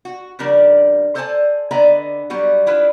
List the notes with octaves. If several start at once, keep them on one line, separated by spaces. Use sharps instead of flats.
F#4
C#3 F3 G3 D4 A#4 D5
A4 C5 D5 F#5 G#5 A5
D3 B3 D5 D#5 G#5 A#5
F#3 G3 B3 F#4
D4 E4 F4 B4